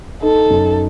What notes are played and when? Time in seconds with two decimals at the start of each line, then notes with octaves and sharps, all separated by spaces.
0.22 D#4 A4
0.50 F#2